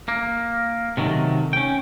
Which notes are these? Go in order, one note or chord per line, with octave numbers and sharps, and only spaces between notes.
A#3
C3 D#3 F#3 A3
C#4 G5